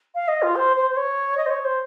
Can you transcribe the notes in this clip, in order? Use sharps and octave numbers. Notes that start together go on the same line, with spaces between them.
F5
D#5
F4
C5
C5
C5
C#5
D#5
C5
C#5
C5